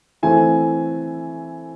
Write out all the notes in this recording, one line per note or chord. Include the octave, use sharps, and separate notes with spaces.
E3 A3 C4 G#5